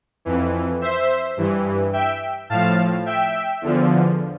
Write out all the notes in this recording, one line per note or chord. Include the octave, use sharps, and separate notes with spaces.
F2 E3
C5 E5
G2 E3
E5 G5
A2 F3 F5 A5
E5 G5
E2 D3 F3